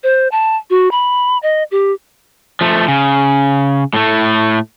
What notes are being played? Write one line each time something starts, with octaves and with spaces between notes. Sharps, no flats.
C5
A5
F#4
B5
D#5
G4
F3 A3
C#3
A2 A3